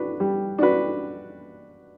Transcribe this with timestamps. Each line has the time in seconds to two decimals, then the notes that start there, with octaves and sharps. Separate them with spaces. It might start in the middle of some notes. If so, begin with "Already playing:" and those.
Already playing: D4 F#4 B4
0.20 G3
0.58 D4 F#4 B4